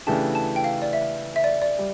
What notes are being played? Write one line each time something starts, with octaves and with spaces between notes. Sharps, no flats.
C#3 E3 A3 D4 G4 A5
A5
G5
F5
D5
E5
E5
D5
D5
G3